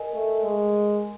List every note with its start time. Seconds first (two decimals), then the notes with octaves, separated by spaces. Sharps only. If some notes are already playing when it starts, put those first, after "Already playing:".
Already playing: A#4 D#5 G#5
0.14 A3
0.44 G#3